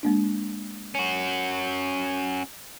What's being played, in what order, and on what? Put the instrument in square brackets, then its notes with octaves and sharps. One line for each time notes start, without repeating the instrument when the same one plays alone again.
[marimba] G#3 A#3 D4
[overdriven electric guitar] C#4 F#4